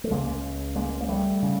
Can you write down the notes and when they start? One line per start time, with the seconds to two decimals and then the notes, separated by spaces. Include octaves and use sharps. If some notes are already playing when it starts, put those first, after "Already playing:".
0.04 A3
0.10 C#2 C#3 G#3 A#3
0.76 G#3 A#3
1.01 A#3
1.08 G3 A3
1.42 C#3